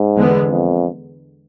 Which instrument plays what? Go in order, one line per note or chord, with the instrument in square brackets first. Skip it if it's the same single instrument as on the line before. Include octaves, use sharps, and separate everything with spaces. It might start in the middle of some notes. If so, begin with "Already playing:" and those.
Already playing: [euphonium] G#2
[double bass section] E2 D3 G#3 B3
[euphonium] F2